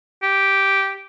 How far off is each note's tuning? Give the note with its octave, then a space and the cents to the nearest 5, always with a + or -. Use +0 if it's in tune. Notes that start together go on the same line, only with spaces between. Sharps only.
G4 -5